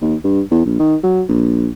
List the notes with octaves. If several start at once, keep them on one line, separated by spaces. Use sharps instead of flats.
D#2
G2
E2
A#1
D#3
F#3
A#1